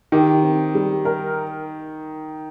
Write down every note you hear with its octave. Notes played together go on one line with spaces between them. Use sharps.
D#3 G4
C4
G3
A#4